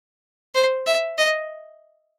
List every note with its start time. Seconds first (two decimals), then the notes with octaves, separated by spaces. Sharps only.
0.55 C5
0.87 E5
1.18 D#5